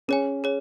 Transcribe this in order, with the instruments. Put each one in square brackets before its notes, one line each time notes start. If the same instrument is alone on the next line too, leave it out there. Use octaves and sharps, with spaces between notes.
[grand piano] C#4 [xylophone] G#4 C#5 G#5
[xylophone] G#4 C#5